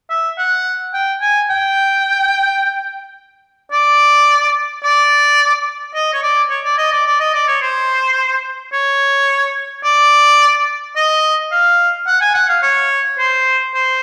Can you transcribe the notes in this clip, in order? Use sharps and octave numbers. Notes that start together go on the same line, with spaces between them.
E5
F#5
G5
G#5
G5
D5
D5
D#5
C#5
D5
C#5
D5
D#5
D5
D5
D#5
D5
C#5
C5
C#5
D5
D#5
F5
F#5
G#5
F#5
F5
C#5
C5
C5